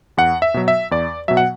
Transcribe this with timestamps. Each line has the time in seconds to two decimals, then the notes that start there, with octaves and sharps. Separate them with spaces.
0.17 E2 F#5
0.42 E5
0.54 B2 F#3
0.68 E5
0.91 E2 D5
1.28 B2 F#3 E5
1.37 F#5